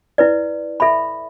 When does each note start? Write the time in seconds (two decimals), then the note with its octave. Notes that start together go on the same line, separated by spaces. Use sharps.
0.18 E4 B4 D5
0.80 A4 E5 B5